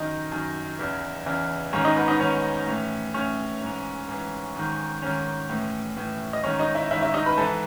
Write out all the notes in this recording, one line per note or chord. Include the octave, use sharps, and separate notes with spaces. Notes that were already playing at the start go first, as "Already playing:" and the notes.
Already playing: F#2 D#3 D#4 D#5
F#2 D#3
E2 C#3 E3
E2 C#3 E3
G#2 D#3 C#4 C#5
D#4 D#5
B3 B4
D#4 D#5
G#2 D#3 C#4 C#5
A2 E3
A2 E3 C#4 C#5
G#2 E3
G#2 E3
G#2 D#3
G#2 D#3 C#4 C#5
A2 E3
A2 E3
D#5
G#2 D#3 C#4 C#5
D#4 D#5
E4 E5
G#2 D#3 E4 E5
E4 E5
D#4 D#5
B4 B5
G#2 E3 A4 A5